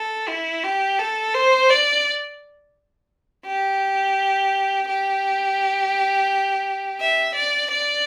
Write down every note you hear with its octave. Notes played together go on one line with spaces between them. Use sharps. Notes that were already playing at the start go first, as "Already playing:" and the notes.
Already playing: A4
E4
G4
A4
C5
D5
G4
G4
E5
D5
D5